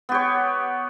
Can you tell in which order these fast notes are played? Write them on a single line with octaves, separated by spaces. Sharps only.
B3 G4 C#5